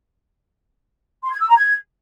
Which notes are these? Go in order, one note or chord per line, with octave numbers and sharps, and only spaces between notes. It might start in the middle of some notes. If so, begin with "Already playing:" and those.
C6
G#6
E6
A#5
G#6